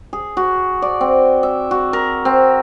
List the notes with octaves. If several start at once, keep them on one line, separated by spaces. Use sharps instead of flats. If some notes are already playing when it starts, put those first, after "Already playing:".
G#4
F#4
D5
C4
E5
F#4
A#4
C4